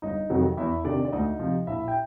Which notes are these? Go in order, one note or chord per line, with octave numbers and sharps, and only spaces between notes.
G1 D#4 D#5
F2 C3 D#3 F#3
E2 E4 E5
C3 D#3 D4 D5
D5
D2 D#4 D#5
C3 F3
A#1 E4 E5
G5